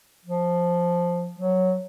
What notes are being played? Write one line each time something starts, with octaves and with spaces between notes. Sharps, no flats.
F3
F#3